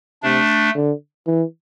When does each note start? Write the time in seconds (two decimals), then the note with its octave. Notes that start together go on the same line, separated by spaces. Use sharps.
0.23 C3 A3 D4
0.76 D3
1.27 E3